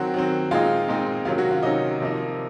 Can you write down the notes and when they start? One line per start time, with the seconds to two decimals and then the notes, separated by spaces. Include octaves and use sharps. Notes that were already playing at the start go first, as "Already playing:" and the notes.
Already playing: D#3 F#3 C4 F#4
0.14 D#3 F#3 C4
0.51 A#2 G#3 C4 D#4 F4
0.88 A#2 G#3 C4 D#4
1.25 C3 D#3 F#3 C#4 F4
1.38 F#3 F#4
1.51 F4
1.62 C3 D#3 F#3 C#4 D#4
2.00 C3 F3 A#3 D#4